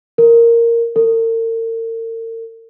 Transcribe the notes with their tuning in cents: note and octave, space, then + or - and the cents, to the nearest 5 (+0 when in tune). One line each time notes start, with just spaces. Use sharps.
A#4 -5
A#4 -45